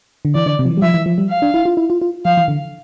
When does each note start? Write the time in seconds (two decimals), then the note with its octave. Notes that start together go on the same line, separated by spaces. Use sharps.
0.25 D3
0.35 E3 D5
0.46 D3
0.59 C3
0.65 F3
0.70 E3
0.77 G3
0.82 F3 E5
0.94 E3
1.06 F3
1.18 G3
1.30 F5
1.42 D4
1.54 E4
1.65 F4
1.77 E4
1.90 F4
2.01 F4
2.25 F3 F5
2.37 E3
2.48 D3